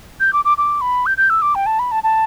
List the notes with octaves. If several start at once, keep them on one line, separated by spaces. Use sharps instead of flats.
G6
D6
D6
D6
B5
G6
G6
E6
D6
G5
A5
B5
A5
A5